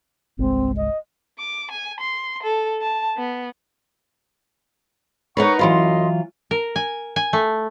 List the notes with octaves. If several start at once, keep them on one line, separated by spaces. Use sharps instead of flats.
G1 C2 G#3 C4
D#5
D6
G#5
C6
A4
A5
B3
D#4 A#4 B4 C#5 F#5 C#6
F#2 E3 F#3 F4 D#5 C6
A#4
G#5
G#5
A3